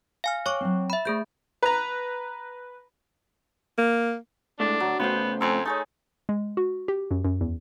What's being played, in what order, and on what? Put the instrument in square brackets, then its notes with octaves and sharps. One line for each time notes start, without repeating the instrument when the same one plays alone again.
[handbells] F5 G#5 F6
[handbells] C#5 C#6 D6 [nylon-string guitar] G5
[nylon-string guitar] F#3 C4
[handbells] E5 B5
[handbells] A3 G#4 G6 [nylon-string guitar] C5
[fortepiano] B4 A#5
[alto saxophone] A#3
[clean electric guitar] A2 G#3 A3 [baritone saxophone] D4
[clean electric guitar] D2 [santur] F#3
[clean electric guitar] C#3 A3 C5 [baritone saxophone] B3 [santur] G5 C6
[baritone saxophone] F2 [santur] G#5 C6 E6
[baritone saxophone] A3 [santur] D#4 G#4 C#5
[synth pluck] G#3
F#4
G4
F#2
F#2
E2